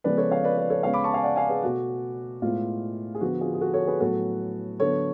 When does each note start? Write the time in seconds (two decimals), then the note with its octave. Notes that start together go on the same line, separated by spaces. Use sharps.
0.04 C#3 F3 G#3 B3 B4 D5
0.17 A4 C#5
0.31 C#5 F5
0.44 B4 D5
0.57 B4 D5
0.70 A4 C#5
0.83 C#3 G#3 B3 C#5 F5
0.93 B5 D6
1.04 A5 C#6
1.14 F5 G#5
1.23 D5 F#5
1.36 F5 G#5
1.49 G#4 B4
1.63 B2 A3 F#4
2.42 A2 G#3 B3 F4
3.15 G#4
3.21 D3 F3 B3 F#4
3.41 F4 G#4
3.54 G#4
3.61 F#4 A4
3.74 A4 C#5
3.87 G#4 B4
4.00 A2 F#3 B3 F#4 A4
4.80 D3 F#3 B3 A4 C#5